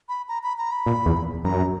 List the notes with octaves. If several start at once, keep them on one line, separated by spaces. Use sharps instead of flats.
B5
A#5
B5
A#5
B5
A#2
E2
F#2 A#5